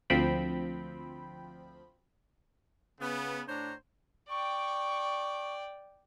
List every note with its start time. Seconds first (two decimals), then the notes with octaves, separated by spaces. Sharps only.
0.10 D2 F3 C4 G5 B5
3.00 C#3 B3
3.48 A2 D4 C5 C#5 A#5
4.30 D5 G5 C#6